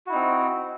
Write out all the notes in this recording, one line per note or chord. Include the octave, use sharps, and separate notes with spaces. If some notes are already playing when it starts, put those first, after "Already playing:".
C4 D#4 E4 F#4